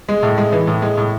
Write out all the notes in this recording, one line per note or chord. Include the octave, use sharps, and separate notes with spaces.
G#3
A2
G#3
E3
A2
G#3
A2